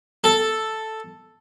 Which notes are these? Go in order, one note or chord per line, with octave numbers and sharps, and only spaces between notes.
A4